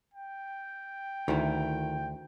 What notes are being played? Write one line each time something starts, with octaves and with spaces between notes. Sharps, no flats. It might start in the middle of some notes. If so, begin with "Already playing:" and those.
G5
D2 D#3 E4